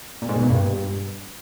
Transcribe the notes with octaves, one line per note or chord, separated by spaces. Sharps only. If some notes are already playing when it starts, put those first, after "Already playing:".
A#2
G#2
B2
A#2
G2